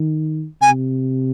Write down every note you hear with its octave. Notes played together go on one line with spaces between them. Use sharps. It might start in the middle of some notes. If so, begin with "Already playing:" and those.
Already playing: D#3
C3 G#5